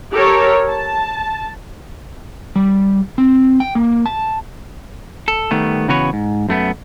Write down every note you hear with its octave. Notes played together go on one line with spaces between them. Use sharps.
G4 A4 A#4 C#5
A5
G3
C4
G5
A#3
A5
A4
D#3 G3 A3 B3
C#3 E3 B3 F#4 B4 C#5
G#2
F#2 A3 B3